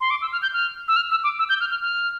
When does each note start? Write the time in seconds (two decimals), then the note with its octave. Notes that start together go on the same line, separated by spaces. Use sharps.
0.01 C6
0.11 D6
0.22 E6
0.32 F6
0.42 G6
0.53 F6
0.88 E6
0.96 F6
1.11 E6
1.24 D6
1.39 E6
1.49 G6
1.61 F6
1.71 F6
1.82 F6